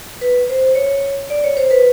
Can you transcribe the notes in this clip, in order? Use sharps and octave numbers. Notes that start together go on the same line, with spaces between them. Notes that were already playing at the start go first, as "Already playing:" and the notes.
B4
C5
C#5
D5
C#5
C5
B4